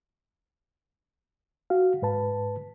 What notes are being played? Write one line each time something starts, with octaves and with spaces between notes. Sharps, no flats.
F#4 F5
G#2 B4 A5